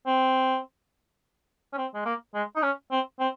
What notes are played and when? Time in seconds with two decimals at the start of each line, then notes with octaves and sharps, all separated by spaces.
0.06 C4
1.73 C#4
1.77 C4
1.94 G#3
2.05 A#3
2.34 G#3
2.56 D#4
2.62 C#4
2.91 C4
3.20 C4